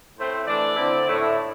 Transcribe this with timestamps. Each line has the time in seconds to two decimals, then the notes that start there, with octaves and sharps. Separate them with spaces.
0.17 A2 A3 C4 C5
0.46 E3 A3 D4 D5
0.76 D3 C4 E4
1.07 A2 A3 E4